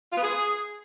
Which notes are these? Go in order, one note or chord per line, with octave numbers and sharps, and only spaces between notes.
F4
B3
G#4